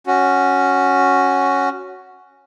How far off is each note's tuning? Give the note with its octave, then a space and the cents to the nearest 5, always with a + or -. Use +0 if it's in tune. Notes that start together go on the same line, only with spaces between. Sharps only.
C#4 +0 F#4 +0